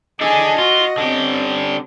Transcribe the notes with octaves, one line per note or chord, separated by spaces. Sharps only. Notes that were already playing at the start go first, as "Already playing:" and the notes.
D4 G#4 A4 D#5 G#5
F4 F#4
D3 C4 C#4 G4